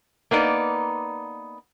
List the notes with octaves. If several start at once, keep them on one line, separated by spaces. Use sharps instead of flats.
A#3 B3 D#4 D5